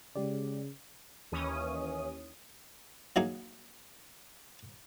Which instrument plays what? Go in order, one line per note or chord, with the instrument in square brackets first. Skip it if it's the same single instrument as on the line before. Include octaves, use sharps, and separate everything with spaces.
[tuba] C#3 [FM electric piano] G#3 G4 D5
[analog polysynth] D#2 E3 C#4 D#6
[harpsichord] F#3 A#3 D#4 G#4